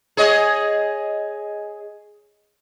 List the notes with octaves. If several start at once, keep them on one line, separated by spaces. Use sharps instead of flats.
G#4 C#5 D#5